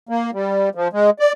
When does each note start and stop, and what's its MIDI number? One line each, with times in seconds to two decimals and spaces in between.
0.09 0.31 58
0.33 0.69 55
0.75 0.88 53
0.93 1.10 56
1.19 1.33 74